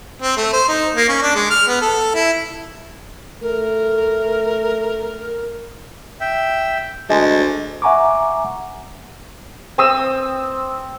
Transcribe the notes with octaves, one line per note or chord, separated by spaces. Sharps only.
C4
A3
C5
D#4
A#3
C#4
D4
G#3
F6
B3
A4
E4
A3 A#4
E5 G5
D2 G#3 A5
E5 F#5 G#5 A#5 C#6 D6
C4 D#6 E6